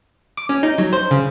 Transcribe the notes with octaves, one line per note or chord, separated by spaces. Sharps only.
D6
C#4
D#4
F#3
C5
C#3